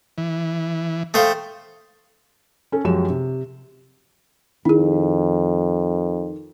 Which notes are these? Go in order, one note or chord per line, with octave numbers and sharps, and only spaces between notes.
E3
A3 C5 F5 G5 D#6
C#4 A4
F#2 F3 G#3 F#4 G4 E7
C3
F2 D#3 E4 G#4